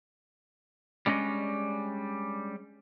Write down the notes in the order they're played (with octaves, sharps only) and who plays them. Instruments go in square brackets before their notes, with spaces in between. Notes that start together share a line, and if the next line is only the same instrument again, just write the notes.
[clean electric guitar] G3 G#3 C#4 D4 D#5